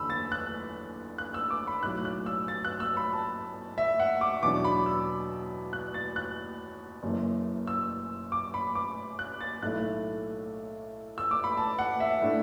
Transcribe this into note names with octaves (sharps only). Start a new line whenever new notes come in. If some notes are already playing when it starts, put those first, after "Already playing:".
Already playing: F#1 E2 D3 B5 E6
A6
F#6
F#6
E6
D6
B5
B1 A2 F#3 F#6
F#6
E6
A6
F#6
E6
B5
A5
E5
F#5
D6
E2 B2 F#3 D4 D6
B5
E6
F#6
A6
F#6
F#1 F#2 E3
E6
D6
B5
D6
F#6
A6
B1 A2 A3 E4 F#6
E6
D6
B5
A5
F#5
E5
A2 A3 D4